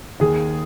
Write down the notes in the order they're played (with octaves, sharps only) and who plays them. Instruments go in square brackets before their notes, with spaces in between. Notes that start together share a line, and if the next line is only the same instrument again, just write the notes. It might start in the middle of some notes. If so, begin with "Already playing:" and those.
[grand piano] D#2 G#4